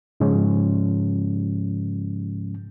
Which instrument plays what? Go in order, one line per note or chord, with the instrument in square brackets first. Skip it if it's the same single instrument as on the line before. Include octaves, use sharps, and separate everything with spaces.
[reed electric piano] G#2 C#3 F3 G#3 C#4